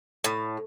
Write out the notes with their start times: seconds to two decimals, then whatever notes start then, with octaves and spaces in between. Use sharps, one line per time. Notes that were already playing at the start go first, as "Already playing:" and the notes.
0.24 A2